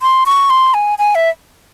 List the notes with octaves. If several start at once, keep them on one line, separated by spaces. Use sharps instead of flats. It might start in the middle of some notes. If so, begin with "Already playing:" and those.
C6
C#6
C6
G#5
G#5
E5